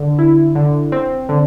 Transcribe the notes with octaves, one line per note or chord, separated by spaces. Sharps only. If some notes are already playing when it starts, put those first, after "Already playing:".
Already playing: D3
E4
D3
C4
D3